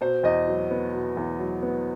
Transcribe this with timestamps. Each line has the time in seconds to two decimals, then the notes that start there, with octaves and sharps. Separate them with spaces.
0.01 B2 C5
0.23 E2 D#5
0.48 F#3
0.71 B3
0.93 B2
1.17 E2
1.39 F#3
1.62 B3